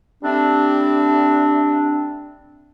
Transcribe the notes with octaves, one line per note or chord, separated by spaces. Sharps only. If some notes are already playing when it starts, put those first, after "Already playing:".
G3 A3 C4 D4